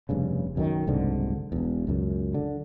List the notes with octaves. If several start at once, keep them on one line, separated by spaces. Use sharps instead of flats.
F1 G2 C#3
B1 F#2 D3 D#3
F#1 C2 G#2 D3
E1 E2
C#2 F#2
D3